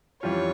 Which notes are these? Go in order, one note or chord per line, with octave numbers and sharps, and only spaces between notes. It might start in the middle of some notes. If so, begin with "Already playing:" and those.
F2 E3 G3 C#4 F4 C#5